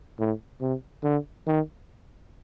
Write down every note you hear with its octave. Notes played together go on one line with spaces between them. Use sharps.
A2
C3
D3
D#3